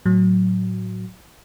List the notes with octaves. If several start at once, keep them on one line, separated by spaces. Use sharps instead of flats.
A2 F#3